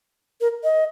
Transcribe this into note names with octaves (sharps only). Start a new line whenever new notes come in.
A#4
D#5